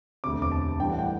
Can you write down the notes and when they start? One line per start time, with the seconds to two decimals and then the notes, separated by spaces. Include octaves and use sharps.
0.24 E1 D2 C3 D6
0.42 D6
0.51 A5
0.80 A1 A2 E3 G3 G5
0.90 F#5
0.99 G5